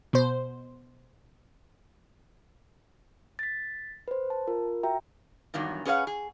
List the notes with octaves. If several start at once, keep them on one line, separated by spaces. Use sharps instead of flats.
B2 C5
A6 B6
B4 C5
A5
F4 A#4
F#4 E5 G5 A#5
E2 G2 D#3 F#3
C#4 G#4 B4 C#5 F5 F#5
G#4